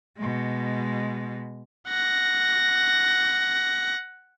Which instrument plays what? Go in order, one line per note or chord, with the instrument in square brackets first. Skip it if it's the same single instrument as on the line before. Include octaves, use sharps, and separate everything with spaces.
[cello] B2 G#3
[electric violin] F#5 A#6